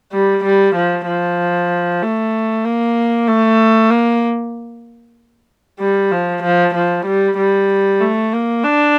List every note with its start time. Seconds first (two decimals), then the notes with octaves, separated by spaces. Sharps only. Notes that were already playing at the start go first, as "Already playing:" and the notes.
0.12 G3
0.44 G3
0.75 F3
1.07 F3
2.02 A3
2.64 A#3
3.28 A3
3.90 A#3
5.80 G3
6.11 F3
6.43 F3
6.74 F3
7.06 G3
7.37 G3
8.01 A3
8.32 A#3
8.64 D4